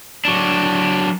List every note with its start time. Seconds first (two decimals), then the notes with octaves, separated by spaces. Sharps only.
0.25 F#3 D4